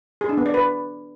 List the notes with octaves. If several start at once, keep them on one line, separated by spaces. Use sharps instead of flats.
G#4
D4
B3
D5
B4